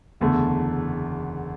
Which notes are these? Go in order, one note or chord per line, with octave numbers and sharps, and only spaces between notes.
F#1 E2 D3 A3